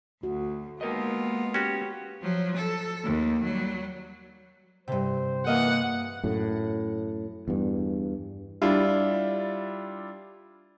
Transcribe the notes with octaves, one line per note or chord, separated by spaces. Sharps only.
D2 F#4
G#3 A#3 B3 F4 A#4 D#5
C#4 F#4 G4
F3 F#3
A4
D#2
F#3 G3
G2 C3 C5
E3 A#3 D#5 F5 F#5 D#6
F#2 A2
E2 G2
G3 D4 E4 F4